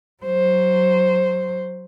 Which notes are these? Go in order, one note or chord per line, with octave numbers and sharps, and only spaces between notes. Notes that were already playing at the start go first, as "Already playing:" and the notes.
F#3 C5